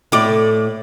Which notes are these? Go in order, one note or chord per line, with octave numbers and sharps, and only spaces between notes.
A2 D5